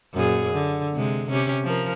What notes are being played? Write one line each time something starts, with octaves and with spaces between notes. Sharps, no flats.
F#2 A#2 G#4
D3
C3 G#3
C3 C#4 G4
F3 A#4